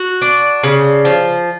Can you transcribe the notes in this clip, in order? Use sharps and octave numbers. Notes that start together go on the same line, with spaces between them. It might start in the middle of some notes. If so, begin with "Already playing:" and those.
Already playing: F#4
D4
C#3
F3